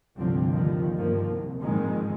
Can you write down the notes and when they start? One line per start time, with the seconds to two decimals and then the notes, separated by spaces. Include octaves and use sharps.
0.16 F1 C2 G2 D3 F3 C4
0.50 D#2 D3 D#3 F3
0.97 G2 D#3 F3 A#3
1.28 C2
1.60 A#1 F2 G#2 D#3 G#3